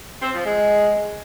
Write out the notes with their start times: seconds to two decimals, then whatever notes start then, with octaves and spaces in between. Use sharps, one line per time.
0.21 C4
0.33 F3
0.45 G#3